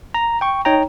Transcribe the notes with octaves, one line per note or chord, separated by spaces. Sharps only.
A#5
G5 C#6
D#4 C#5 G5 A#5